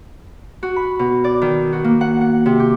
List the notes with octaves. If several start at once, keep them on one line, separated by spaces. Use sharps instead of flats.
F#4
B5
B2
D5
D#3
F#4
A#3
F#5
F#5
C3
G4